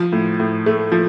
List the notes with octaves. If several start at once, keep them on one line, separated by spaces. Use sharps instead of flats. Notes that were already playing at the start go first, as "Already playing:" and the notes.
Already playing: F3
A2
A2
A3
F3